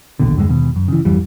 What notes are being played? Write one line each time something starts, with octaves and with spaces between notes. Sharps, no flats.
A#1 D#2 B2 D3
E2 G2 D3 G#3
D#2 B2
F#2
C#3 E3
G#1 F2 E3 G3